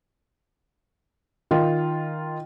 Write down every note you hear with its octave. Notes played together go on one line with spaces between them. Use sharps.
D#3 F4